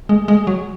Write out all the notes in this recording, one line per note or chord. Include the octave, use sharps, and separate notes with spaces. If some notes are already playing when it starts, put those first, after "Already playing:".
G#3
G#3
F#3